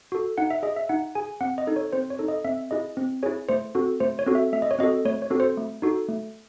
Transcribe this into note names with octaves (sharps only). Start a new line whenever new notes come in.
F#4 A4
D#4 F#5
E5
G#4 D#5
E5
D#4 F#5
G#4 G#5
C4 F#5
D#5
D#4 A4
C#5
C4 C5
C#5
D#4 A4
D#5
C4 E5
E4 G#4 D#5
C4
E4 G#4 C#5
A3 C5
C4 F#4 A4
A3 C5
C#5
C4 F#4 A4
E5
A3 E5
D#5
C#5
C4 F#4 A4 D#5
A3 C#5
C#5
C4 F#4 A4
C5
A3
D#4 F#4 A4
A3